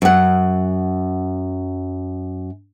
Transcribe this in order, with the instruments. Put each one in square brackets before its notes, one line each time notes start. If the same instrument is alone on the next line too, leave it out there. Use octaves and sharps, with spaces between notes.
[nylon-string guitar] F#2 F#5